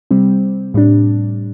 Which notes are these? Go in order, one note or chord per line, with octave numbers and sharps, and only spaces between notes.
C3 G3 C4
A2 G3 D4